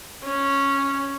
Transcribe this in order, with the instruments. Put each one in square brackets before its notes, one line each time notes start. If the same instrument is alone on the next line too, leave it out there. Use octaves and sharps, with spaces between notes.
[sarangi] C#4